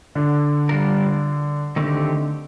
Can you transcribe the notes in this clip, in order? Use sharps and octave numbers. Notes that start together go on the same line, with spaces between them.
D3
G3 D4 F4 A#4
D3 D#3 A3 C4 D#4 G4